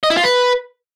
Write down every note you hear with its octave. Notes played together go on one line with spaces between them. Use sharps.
D#5
E4
F4
B4